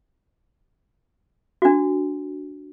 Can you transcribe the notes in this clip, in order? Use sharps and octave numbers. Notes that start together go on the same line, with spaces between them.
D4 F#4